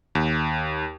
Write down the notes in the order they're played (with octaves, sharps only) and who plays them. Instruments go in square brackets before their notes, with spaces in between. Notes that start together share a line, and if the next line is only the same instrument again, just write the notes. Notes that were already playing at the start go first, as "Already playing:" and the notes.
[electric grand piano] D#2